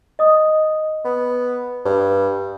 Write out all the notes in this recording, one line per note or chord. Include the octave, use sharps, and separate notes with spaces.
D#5 D#6
B3
G2